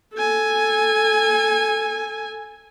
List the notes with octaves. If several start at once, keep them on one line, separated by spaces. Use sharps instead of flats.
A4 G#5